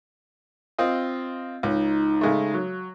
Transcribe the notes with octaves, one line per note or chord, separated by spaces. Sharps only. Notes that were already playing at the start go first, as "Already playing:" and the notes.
C4 F4 D#5
C#2 D#4
C#3 G#3 A3
F#3